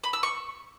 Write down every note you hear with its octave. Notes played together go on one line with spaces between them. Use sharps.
B5
E6
C#6